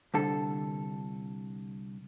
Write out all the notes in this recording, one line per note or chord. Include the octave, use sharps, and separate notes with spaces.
C2 D3 A4